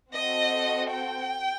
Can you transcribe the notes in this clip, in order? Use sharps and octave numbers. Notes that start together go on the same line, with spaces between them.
C4 F#4 A4 D#5
G5